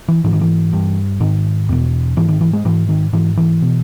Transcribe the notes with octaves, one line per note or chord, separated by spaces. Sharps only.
E3
G#2 E3
D#3
E3
G2
G#2 D#3
E2 B2
G#2 E3
D#3
E3
G#3
G#2 E3
D#3
G#2 E3
E3
B2